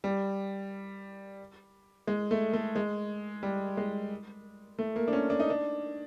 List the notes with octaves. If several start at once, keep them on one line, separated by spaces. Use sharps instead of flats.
G3
G#3
A3
A3
G#3
G3
G#3
A3
A#3
D4
C#4
D4
D#4
D4